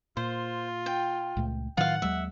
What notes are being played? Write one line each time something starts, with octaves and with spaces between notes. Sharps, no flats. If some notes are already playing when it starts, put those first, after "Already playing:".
A#2 F4 C5
G5
C#2 A#2 A3
A2 D#3 F#3 F4 F5 F#5
D#2 F#3 G#3 E5